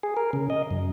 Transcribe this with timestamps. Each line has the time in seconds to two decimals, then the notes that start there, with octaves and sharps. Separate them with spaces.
0.03 G#4
0.17 A#4
0.33 C#3
0.50 D#5
0.71 F#2